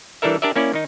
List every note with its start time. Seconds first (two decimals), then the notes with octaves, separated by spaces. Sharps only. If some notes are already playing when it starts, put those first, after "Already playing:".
0.22 E3 G3 D4 A4 A#4 E5
0.42 D4 G4 A#4 D5 E5
0.56 A#3 C#4 E4 D5
0.73 D#3 D#4